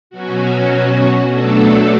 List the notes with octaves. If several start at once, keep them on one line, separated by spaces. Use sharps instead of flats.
B2 F#3 C#4 F#4
B2 F#3 A3 D4 A4